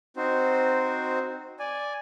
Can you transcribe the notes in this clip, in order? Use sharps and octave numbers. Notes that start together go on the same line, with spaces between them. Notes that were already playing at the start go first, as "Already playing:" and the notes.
C4 D#4 F#4 C5
D5 G#5